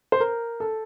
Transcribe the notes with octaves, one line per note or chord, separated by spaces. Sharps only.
C5
A#4
A4